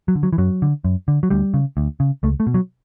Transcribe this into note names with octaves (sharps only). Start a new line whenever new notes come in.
F#3
D3
F#3
E3
F#2 F#3
D3
F#2
D3
F#3
D2 G3
C#3
D2
C#3
C#2 A3
A3
B2
F#3